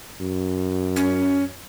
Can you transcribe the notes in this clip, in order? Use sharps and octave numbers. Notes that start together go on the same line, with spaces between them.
F#2
C#4